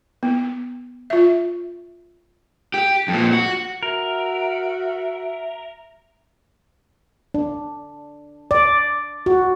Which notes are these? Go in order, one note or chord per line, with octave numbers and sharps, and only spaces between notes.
B3
F4 E5
G4
F2 A#2
F#4
F#4 A#4 E5
D4
D5
F#4